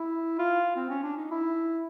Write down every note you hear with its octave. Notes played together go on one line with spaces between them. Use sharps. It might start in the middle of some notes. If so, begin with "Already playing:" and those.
Already playing: E4
F4
C4
C#4
D4
D#4
E4